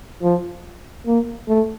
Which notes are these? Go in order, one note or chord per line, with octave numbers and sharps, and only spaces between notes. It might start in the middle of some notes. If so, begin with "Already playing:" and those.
F3
A#3
A3